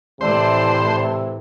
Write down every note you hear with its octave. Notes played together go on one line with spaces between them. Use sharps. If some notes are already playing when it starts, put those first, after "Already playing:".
A2 C3 E3 C5 D5 A5